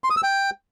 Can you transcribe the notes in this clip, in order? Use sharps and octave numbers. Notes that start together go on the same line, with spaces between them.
C6
D#6
E6
G5